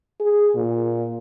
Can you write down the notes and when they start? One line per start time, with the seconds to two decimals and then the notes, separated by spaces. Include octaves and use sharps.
0.20 G#4
0.55 A#2